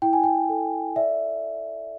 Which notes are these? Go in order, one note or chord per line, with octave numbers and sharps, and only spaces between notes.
E4 G5
G#5
G5
A4
D5 E5